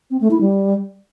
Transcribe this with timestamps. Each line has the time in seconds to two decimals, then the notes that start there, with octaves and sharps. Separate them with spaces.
0.11 C4
0.21 A3
0.31 E4
0.41 G3